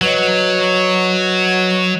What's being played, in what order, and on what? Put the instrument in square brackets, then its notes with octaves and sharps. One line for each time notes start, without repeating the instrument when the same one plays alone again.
[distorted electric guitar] F#3 [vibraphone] B4 C#5 D#5